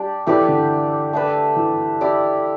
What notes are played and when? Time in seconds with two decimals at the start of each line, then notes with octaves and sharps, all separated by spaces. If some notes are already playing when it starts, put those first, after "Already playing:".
Already playing: G3 D4 G4 D5
0.27 E3 A3 G4 B4 D5
0.48 D3
1.13 A3 D4 B4 E5
1.56 E3
2.01 E4 G4 D5